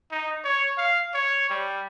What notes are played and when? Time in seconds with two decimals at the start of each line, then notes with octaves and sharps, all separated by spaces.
0.12 D#4
0.44 C#5
0.78 F5
1.15 C#5
1.50 G3